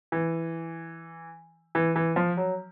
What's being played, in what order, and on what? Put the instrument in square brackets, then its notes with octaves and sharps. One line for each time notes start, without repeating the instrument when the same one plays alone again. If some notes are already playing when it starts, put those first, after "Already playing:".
[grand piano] E3
E3
E3
F3
F#3